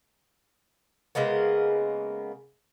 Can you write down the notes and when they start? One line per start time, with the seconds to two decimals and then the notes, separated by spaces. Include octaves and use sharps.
1.15 C#3 G#3 A#3 B3